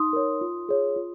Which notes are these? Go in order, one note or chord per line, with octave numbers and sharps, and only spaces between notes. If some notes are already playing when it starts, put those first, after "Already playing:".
Already playing: D#4 C6 D#6
A#4 C#5
F4
G#4 C#5
F4